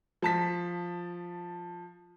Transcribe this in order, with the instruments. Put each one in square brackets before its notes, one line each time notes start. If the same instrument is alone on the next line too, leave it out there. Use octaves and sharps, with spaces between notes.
[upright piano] F3 A5 B6